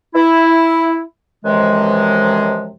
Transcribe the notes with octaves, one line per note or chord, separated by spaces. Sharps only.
E4
F#2 C3 E3 F3 G#3